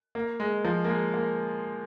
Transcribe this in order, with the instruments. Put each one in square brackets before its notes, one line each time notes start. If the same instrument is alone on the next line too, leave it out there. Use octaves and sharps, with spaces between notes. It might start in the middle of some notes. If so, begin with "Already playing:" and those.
[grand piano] A#3
G#3
F3
A#3
G#3
A#3